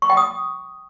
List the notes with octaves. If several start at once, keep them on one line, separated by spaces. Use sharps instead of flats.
C#6
G5
D#6